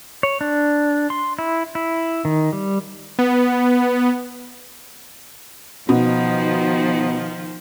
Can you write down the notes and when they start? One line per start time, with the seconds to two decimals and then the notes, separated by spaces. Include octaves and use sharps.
0.23 C#5
0.41 D4
1.10 C6
1.39 E4
1.75 E4
2.25 D#3
2.53 G3
3.19 B3
5.89 B2 D#3 F3 D#4